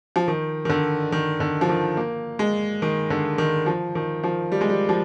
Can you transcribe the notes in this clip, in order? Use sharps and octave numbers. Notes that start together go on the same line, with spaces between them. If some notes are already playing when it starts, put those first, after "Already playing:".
F3
D#3
D#3
D3
D#3
D3
F3
D#3
A#3
G#3
D#3
D3
D#3
F3
D#3
F3
G3
G#3
G3
F3